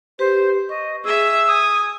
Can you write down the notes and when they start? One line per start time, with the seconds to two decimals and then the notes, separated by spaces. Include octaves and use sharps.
0.19 G4 B4 C5
0.69 D#5 C#6
1.04 G#4 E5 E6
1.48 G#5 D#6